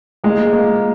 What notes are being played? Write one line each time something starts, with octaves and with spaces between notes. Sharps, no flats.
G#3 A#3
A#3